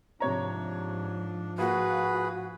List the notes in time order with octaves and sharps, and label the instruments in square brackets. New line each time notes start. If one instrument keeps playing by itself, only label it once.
[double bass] G#2 F3 [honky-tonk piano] C3 C#5 A#5 [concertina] D4
[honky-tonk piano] A#3 F4 [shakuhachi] F#4 [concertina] G#4 B4